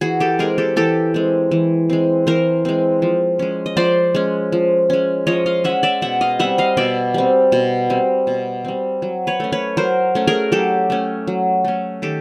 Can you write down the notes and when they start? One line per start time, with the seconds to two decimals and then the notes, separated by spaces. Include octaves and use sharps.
0.01 E3 F#4 G#4
0.20 G4 A4
0.39 G#3 C4 G#4 A#4
0.58 G4 A4
0.76 E3 G4 A4
1.14 G#3 C4
1.51 E3
1.90 G#3 C4
2.27 E3 A#4 C5
2.65 G#3 C4
3.02 F3
3.39 G#3 C#4
3.66 D#5
3.77 F3 C5 D5
4.15 G#3 C#4
4.52 F3
4.90 G#3 C#4
5.27 F3 C#5 D#5
5.46 D#5 F5
5.64 G#3 C#4 E5 F#5
5.83 D5 E5
6.02 B2 E5 F#5
6.21 D#5 F5
6.39 G3 C4 E5 F#5
6.58 D#5 F5
6.77 B2 D5 E5
7.14 G3 C4
7.52 B2
7.90 G3 C4
8.27 B2
8.65 G3 C4
9.02 F#3
9.27 B4 C#5
9.40 A3 C#4
9.52 B4 C#5
9.77 F#3 A#4 C5
10.15 A3 C#4
10.27 G#4 A#4
10.52 F#3 G4 A4
10.90 A3 C#4
11.27 F#3
11.65 A3 C#4
12.02 D#3 G4 A4